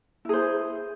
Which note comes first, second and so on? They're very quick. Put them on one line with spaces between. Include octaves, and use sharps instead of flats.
E4 G#4 C5